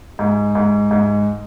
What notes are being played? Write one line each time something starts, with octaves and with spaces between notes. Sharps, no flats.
G#2
G#2
G#2